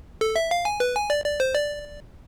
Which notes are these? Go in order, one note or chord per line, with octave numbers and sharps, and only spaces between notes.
A4
E5
F5
G#5
B4
G#5
D5
D5
C5
D5